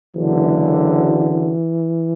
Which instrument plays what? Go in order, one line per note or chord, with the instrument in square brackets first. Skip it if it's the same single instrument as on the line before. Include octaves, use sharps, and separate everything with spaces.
[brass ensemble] F#1 F#2 D3 [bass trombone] E3